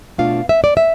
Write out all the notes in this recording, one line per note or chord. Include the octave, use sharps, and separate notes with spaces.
B2 A3 D4 F4 F5
E5
D5
E5